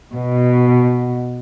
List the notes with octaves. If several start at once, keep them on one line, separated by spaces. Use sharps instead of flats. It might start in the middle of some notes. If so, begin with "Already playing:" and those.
B2